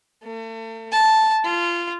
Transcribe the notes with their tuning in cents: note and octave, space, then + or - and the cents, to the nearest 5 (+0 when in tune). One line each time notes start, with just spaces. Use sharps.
A3 +40
A5 -5
F4 -20